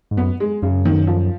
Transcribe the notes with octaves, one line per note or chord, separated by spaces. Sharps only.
G#2
F#2 B3
G#3
F#2 C#3
D#3
F3